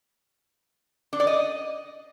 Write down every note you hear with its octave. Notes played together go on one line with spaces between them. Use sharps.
D4
D5
D#5